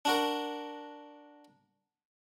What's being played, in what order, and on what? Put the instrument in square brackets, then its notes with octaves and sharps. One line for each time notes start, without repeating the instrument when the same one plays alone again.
[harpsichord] D4 F#4 A#4